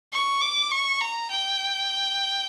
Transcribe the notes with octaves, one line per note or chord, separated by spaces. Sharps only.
C#6
D6
C#6
A#5
G5